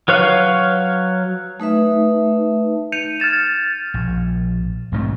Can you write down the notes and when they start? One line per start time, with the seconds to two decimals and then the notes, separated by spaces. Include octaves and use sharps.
0.08 F#3 B4 C#5 F5
1.60 A3 D#4 B4 E5
2.92 G6 C#7 D#7 F7
3.20 F6 G#6 A6 E7
3.33 A6
3.94 A#1
4.92 B1 G#2 A3 C4